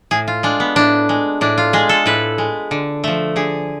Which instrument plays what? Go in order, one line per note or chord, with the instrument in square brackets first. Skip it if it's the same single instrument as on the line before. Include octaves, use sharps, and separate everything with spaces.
[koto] A2 G#4
F4
G#3 D4
B3
A2 D4
G#3
A2 D4
F4
G#3 G#4
A4
A2 B4
G#3
D3
F3 A3
D3 G#4